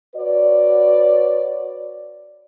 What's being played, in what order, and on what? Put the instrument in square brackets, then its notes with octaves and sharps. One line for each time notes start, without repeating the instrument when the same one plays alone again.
[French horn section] F#4 B4 C#5 D5